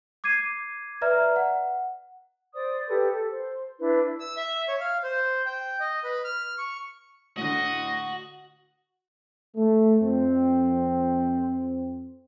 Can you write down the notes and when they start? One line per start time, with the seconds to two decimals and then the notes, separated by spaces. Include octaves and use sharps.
0.24 D6 G#6 C7 D#7
1.01 B4 D5 E5 A#5 F6
1.36 F#5
2.54 C5 D5 D#6
2.89 G4 A4 B4
3.12 A4
3.29 C5
3.79 D4 E4 B4
4.20 E6
4.37 E5
4.68 C#5
4.81 F5
5.03 C5
5.46 G5
5.80 D#5
6.04 B4
6.24 F6
6.58 C#6
7.37 A2 D3 F#4 D#5
9.56 A3
10.02 F2 C4